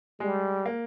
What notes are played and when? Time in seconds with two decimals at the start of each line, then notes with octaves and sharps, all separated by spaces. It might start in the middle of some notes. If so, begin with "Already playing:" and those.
0.20 G3 G#3
0.66 A#3